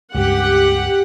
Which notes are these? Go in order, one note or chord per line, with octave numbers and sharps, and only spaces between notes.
C#2 G2 G4 F#5